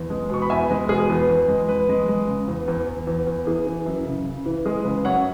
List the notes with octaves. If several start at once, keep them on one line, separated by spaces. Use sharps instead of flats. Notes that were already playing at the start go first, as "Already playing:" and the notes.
Already playing: E2
G#3
B2 C#6
B5
E2 E5 G#5
G#3 B4
B2 G#4
E2 B4
E2
G#3
E2 B4
G#3
G#3
C#3
E2
E2
E2
E2
E2
E3 G#4
E3
F#2
C#3
C#3
E3
G#3 G#4
C#3 B4
F#2 C#5 F#5